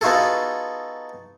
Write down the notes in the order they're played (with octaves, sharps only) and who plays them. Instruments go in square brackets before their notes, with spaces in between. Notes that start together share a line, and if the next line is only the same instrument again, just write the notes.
[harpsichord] B3 D#4 F4 F#4 G#4 A4